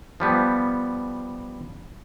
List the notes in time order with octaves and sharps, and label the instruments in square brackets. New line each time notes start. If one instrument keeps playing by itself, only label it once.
[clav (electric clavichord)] F3 G3 B3